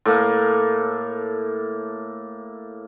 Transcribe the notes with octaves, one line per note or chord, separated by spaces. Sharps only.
A2 A#3